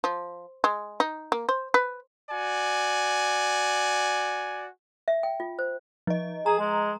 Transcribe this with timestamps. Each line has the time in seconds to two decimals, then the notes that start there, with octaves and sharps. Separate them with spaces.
0.04 F3
0.64 G#3
1.00 D#4
1.32 A#3
1.49 C5
1.74 B4
2.31 F#4 D5 G#5
5.08 E5
5.23 G5
5.40 F4
5.59 C5
6.07 F3 D#5
6.46 G#4 A#5
6.59 G#3